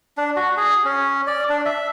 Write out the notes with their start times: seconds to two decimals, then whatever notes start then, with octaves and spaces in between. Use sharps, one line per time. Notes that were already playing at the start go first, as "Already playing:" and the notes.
0.17 D4
0.36 F#4
0.57 G#4
0.85 C#4
1.27 D5
1.50 D4
1.66 E5